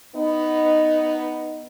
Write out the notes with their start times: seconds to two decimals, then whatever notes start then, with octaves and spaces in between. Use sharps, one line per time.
0.16 B3 D#4